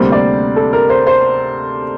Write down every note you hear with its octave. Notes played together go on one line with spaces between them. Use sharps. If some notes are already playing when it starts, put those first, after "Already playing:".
Already playing: D2 C3 G3 A#3 C5
D5
A4
A#4
C5
C5